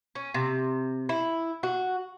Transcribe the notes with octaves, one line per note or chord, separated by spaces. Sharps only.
C#4
C3
E4
F#4